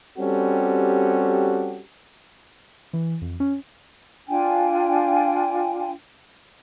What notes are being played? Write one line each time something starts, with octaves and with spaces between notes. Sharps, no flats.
G3 C4 C#4 F#4 G4 A4
E3
F2
C#4
D4 F4 G5 G#5